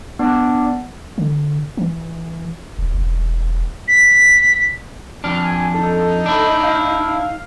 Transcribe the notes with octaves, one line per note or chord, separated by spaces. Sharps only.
B3 D4
D3
E3
D1
E1
B6
F2 D4 F6
G#5
D#4 A4
D4 E4
F5